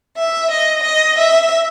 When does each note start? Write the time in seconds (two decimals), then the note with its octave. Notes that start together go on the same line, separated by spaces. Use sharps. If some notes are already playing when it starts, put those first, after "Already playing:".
0.16 E5
0.50 D#5
0.82 D#5
1.17 E5